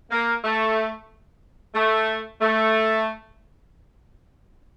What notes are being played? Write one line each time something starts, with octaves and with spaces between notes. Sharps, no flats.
A#3
A3
A3
A3